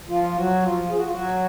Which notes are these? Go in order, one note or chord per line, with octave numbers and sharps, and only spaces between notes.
F3 F4
F#3 F#4
F3 F4
G#4
F#4
F4
F#3 F#4